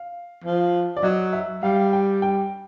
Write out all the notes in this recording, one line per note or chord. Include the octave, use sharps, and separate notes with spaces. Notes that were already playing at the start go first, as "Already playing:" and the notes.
Already playing: F5
F3
D5
F#3 D#5
E5
G3 F5
G5
G5